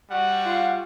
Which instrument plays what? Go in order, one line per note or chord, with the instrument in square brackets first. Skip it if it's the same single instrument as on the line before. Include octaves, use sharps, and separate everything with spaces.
[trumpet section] G3 F#4 F#5
[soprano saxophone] F4